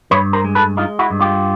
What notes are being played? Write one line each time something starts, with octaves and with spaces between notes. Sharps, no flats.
G2 B4 C#5
A#4 C5
G#3
A4 B4
G#3 D#4 F4
E4 F#4
G2
F4 G4